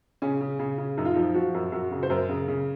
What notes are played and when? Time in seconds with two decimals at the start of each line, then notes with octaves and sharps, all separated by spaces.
0.22 C#3 C#4
0.41 C#3
0.59 C#3
0.78 C#3
0.97 F#2 D#4
1.05 F4
1.14 F3 D#4
1.35 F3 F#4
1.54 F#2
1.72 F#2 F#4
1.91 C#3
2.03 C5
2.10 F#2 A#4
2.29 C#3
2.48 C#3